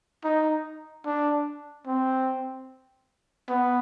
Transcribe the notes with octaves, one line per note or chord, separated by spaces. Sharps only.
D#4
D4
C4
B3